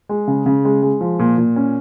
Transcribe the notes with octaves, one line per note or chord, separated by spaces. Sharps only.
G#3
C#3
C#3
G#3
G#3
F3
A#2
A#2
C#4